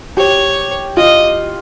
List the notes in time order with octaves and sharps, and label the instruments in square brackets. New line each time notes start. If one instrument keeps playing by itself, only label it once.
[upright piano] G4 [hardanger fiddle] C#5
[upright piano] F4 [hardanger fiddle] D#5